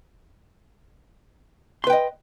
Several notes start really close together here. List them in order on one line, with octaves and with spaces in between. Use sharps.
C6 B4 G5 D#5